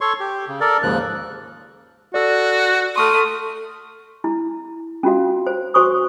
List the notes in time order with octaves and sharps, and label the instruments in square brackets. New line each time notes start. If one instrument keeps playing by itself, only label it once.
[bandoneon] A4 C#5 C6 C#6
G4
C#3
A4 A#4 D5
D#2 G#2 C#3 F3 F#6
[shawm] F#4 [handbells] A4 D5
[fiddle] A3 D#6 [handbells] C6 C#6 F6
[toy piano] E4
C#4 F4 F#4 F5
C5
F#4 C5 C#6 D#6